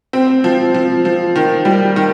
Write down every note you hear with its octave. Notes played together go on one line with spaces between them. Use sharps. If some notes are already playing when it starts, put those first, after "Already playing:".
C4
F3
F3
F3
D#3
G3
D#3